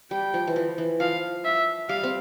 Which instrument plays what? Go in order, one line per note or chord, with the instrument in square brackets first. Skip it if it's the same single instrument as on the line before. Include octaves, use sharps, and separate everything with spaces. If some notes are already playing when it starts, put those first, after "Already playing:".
[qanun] G3 [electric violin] G5
[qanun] F3
E3
F3
E3
[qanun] F3 [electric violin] F5
[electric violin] E5
[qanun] G3 [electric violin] F5
[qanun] C4